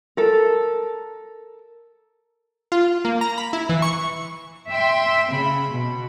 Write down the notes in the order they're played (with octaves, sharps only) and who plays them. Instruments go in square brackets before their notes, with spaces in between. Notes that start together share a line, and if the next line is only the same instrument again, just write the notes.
[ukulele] A4 A#4
[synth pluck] F4
A#3
A#5
B5
E4
E3
C#6
[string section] E5 G5 C6
C#3 B5
B2